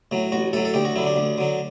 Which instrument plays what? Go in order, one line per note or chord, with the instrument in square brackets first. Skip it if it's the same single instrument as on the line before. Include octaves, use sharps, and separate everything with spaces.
[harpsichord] A2 F#3
A1 F#4
A2 F#3 A4
A4
D2 G4
F#4
D3 F#3 E4
D4
D2
D3 F#3